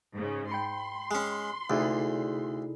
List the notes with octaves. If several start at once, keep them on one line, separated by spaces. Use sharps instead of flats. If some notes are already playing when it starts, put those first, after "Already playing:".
G#2 C#3
G5 B5 C6 G6 C#7
G#3 C#4
D2 C3 D#4 E4 G#4 A4 D5